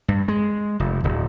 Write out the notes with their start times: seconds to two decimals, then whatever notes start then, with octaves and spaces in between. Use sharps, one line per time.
0.08 G2
0.28 G#3
0.80 F1
1.04 D1